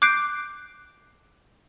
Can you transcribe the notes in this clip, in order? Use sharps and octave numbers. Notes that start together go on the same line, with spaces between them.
D6 F#6 G6 C7 D7